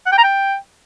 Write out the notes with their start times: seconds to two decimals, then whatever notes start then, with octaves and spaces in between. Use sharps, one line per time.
0.06 F#5
0.12 G5
0.18 A#5
0.24 G5